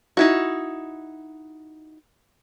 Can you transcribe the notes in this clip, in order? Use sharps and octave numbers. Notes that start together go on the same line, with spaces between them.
D#4 E4 F#4